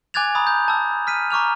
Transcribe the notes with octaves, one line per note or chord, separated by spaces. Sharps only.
G#5 D6 F#6 G#6 A6 F7
A#5 B5 D#6
G6
A5 E6
F6 B6 D#7
A#5 C#6 D6 F6 F7